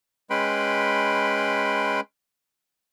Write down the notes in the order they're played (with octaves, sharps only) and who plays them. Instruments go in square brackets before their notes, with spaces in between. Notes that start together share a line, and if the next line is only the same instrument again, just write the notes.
[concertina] G#3 C#4 B4 G5 B5 C6